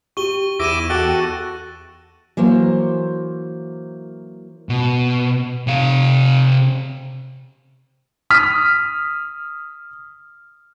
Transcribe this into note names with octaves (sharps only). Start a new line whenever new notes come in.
G4 C#6 D#7 G7
E2 E4 D6 A#6 D#7 E7
F#4 A4 G5 D7 G7
E3 F#3 A#3 C5
B2
C3 F5
D#6 F6 B6